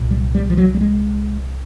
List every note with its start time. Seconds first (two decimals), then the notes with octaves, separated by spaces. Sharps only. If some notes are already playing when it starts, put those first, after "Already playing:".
Already playing: C2 A#2
0.11 G3
0.35 G3
0.50 F3
0.57 F#3
0.75 G3
0.81 G#3